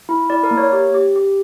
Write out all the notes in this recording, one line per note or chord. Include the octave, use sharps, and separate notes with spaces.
E4
E4 D5
A#4
A#3
C#5
G4
G4
G4